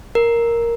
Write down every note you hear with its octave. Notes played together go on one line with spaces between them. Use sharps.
A#4